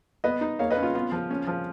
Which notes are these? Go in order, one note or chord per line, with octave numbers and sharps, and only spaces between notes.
B3 B4 D#5
D#4
A#3 C#5 F5
B4 D#5
C#4
F4
B3 F4
F3
C#4
F3